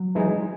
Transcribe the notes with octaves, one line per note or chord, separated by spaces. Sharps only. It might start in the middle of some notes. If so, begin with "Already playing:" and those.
Already playing: F#3
E3 G#3 D#4 G#4